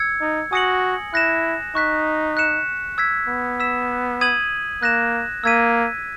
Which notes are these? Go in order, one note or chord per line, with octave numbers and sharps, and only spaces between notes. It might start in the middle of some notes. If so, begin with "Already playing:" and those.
Already playing: E6 G#6 C#7
D#4
F#4 G#5 D#6 A#6 C#7 F#7
E4 F#6 A#6 E7
D#4 C#6 F#6 B6
F#6 C#7 E7
E6 G#6 B6
B3
E6 B6 E7
D#6 G#6 D#7 F#7
A#3 F#6 A#6 E7
A#3 E6 G#6 B6 D#7